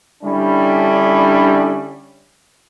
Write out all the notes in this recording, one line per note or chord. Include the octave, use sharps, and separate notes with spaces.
D3 G3 C#4 D4 E4